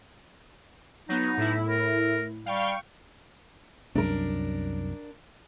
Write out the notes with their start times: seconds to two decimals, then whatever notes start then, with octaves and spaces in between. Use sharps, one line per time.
1.09 F#3 B3 D#4
1.37 A2 E4
1.66 A#4
2.46 G3 F5 G5 C#6
3.95 C2 F#2 D4 A#4